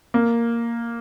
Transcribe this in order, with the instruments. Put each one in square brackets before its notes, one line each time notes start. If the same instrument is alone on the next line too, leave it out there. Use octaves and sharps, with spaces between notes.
[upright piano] A#3